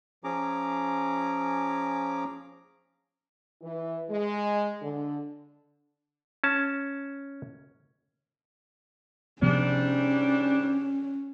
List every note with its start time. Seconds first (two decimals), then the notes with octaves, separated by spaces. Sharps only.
0.24 F3 C#4 G#4 A#5 D6
3.62 E3
4.09 G#3
4.82 D3
6.44 C#4 A5
9.42 G#2 C3 F3 G3 B3 C#4 D4